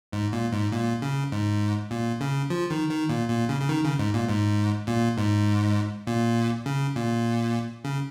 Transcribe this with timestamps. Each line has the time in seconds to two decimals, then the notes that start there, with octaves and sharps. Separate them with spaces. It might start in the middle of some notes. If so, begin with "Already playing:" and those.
0.12 G#2
0.32 A#2
0.53 G#2
0.72 A#2
1.02 C#3
1.32 G#2
1.91 A#2
2.21 C#3
2.50 F3
2.70 D#3
2.90 D#3
3.09 A#2
3.30 A#2
3.49 C#3
3.61 C#3
3.69 D#3
3.84 C#3
3.99 G#2
4.14 A#2
4.29 G#2
4.87 A#2
5.18 G#2
6.07 A#2
6.66 C#3
6.96 A#2
7.84 C#3